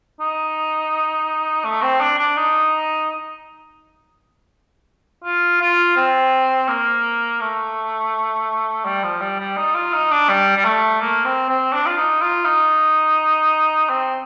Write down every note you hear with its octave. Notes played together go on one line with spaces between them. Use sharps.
D#4
A3
C4
D4
D4
D#4
F4
F4
C4
A#3
A3
G3
F3
G3
G3
D#4
F4
D#4
D4
G3
G3
A3
A#3
C4
C4
D4
F4
D#4
F4
D#4
C4